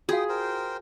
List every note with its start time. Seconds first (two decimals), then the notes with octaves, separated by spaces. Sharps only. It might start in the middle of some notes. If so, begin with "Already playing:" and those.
0.09 F4 F#4 G#4 F5 G5 D#6
0.29 A#4 C5 G5